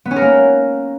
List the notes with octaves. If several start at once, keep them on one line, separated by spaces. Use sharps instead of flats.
B3
C#4
A#4
A#3